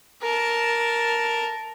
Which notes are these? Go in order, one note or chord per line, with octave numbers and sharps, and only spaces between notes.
A#4 A5